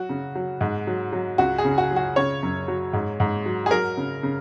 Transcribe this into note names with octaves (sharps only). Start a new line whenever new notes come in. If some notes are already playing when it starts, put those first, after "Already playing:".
Already playing: F#3 F#4
C#3
F#3
G#2
F#3
F#3
C#2 F#4
G#4
C#3
F#4
F#3
F#4
C#3 C#5
F#2
F#3
G#2
G#2
F#3
G#4
F#3 A#4
C#3
C#3